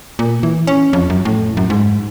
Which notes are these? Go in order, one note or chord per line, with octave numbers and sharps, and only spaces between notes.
A#2
E3
C#4
F2
F#2
A2
F#2
G#2